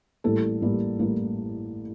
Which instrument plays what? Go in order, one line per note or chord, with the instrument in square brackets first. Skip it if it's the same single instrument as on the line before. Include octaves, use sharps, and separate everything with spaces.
[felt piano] A1 A2 G3 A#3 A4
A1 A2 G3 A#3
A1 A2 G3 A#3